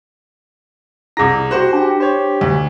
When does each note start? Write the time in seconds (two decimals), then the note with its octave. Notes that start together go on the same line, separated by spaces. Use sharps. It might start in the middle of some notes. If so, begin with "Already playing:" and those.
1.17 C2 E4 G#4 D6 A#6
1.51 F#4 G4 C5 F#5
1.73 C#4 D4 G4 A5
2.00 C5 C#5
2.41 D2